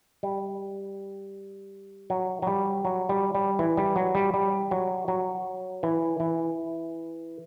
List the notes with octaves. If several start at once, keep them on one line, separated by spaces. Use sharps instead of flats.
G3
F#3
F#3
G3
F#3
G3
G3
E3
G3
F#3
G3
G3
F#3
F#3
E3
E3